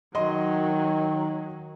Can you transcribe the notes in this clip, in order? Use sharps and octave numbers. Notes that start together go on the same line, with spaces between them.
D#3 F#3 D#5 C6